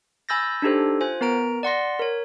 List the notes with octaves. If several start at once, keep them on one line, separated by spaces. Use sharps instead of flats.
G#5 B5 E6 G6 A6 A#6
D4 D#4 G4 A4 C5
F4 C5 G#5
B3 A#4 A#5 D7
D5 F#5 C6 A#6
A#4 C#5